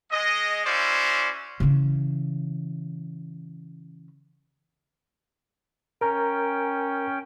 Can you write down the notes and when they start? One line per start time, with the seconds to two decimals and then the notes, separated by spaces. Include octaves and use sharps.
0.11 G#3 D#5
0.66 C#4 E4 F#4 C5 D5
1.60 C#3 E3
6.01 C#4 A#4 G5 A#5